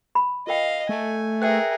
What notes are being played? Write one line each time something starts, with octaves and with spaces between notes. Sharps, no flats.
B5
F4 A#4 D#5 F5 G5
A3 G#5
G#4 A#4 B4 E5 G5 F#6